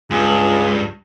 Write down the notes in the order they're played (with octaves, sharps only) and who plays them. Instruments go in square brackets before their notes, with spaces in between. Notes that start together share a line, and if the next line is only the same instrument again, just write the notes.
[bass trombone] C#2 [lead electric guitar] G2 [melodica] F4 G#4